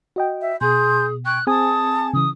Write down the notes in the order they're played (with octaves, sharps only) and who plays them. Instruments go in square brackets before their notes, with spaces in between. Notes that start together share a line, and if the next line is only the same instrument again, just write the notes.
[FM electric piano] F#4 D#5 G5
[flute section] E5
[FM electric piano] B2 [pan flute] G#4 [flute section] G#5 C6 G6
[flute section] G5 C#6 G#6 [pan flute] F#6
[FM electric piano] C4 G#4 G#5 [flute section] A5 [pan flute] D#6
[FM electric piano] C#3 E3 [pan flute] D#6